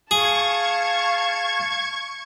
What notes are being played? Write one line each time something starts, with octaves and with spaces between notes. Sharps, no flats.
G#4 F5 A5 C#6 G#6